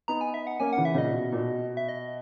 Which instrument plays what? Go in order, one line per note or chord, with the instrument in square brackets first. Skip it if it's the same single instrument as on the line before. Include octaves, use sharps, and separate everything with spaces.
[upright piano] B3 D#4 [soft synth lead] A#5
[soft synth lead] G#5
E5
F#5
[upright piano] A#3 C#4 [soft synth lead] G#5
[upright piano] C#3 E3 [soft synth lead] F#5
[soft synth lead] E5
[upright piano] A#2 C#3 [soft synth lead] D#5
[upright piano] B2
A#2
B2
[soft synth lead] E5
D#5